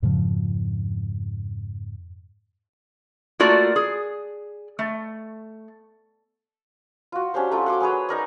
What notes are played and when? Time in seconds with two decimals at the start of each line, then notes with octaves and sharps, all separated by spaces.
0.02 F2 G#2 C#3 F3
3.40 A3 A#3 F4 F#4 D5 A#5
3.76 G#4
4.79 A3
7.12 F4 F#4
7.34 C#4 D4 G4 C5
7.51 F#3 A3 C#4 F4
7.66 F#5 C6 D6
7.80 C#4 G#4 B4 C#5
8.09 D#4 A#4 D5